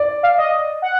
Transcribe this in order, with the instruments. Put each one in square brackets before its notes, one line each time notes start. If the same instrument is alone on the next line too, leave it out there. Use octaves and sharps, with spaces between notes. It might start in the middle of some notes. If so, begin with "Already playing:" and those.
Already playing: [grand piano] D5
[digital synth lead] F5
D#5
F#5